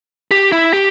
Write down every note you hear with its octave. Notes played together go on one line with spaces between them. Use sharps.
G4
E4
G4